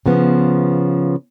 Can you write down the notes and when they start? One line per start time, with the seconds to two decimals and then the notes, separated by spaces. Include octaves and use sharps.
0.06 C#3 F3 B3